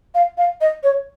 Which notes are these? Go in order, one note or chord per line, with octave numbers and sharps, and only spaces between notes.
F5
F5
D#5
C#5